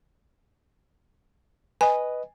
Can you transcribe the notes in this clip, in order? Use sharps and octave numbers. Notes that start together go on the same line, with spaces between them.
B4 D#5 G#5